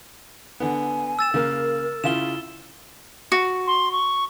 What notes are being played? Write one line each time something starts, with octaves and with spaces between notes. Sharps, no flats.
D3 B3 G#5
E6 A6 E7
C#3 A#3 A#4
C#3 E4 F4 E7 G7
F#4
C6
C#6